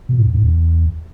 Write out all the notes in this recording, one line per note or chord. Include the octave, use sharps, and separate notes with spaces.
B2
A2
F2
A2
E2